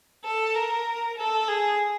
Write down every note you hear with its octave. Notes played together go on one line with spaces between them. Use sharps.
A4
A#4
A4
G#4